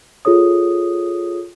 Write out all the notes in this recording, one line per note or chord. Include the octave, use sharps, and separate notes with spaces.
F4 G#4 A4 C#5 D#6